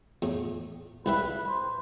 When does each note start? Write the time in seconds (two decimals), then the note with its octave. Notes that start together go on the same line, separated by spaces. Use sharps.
0.22 E2 A2
1.06 C2 G3 B4 E5
1.48 C5